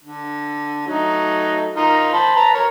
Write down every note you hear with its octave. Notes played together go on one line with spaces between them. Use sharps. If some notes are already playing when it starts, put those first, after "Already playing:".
D3
F#3 A3 D#4
D#4 F4 A#4
C5 A5 B5
B4 A5 A#5
A#4 C#5